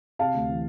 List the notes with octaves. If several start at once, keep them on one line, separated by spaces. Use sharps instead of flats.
C3 F5 A5
D2
E3